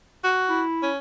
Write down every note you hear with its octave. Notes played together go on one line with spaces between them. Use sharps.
F#4
E4
C#4